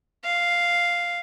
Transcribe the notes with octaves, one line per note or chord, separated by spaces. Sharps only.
F5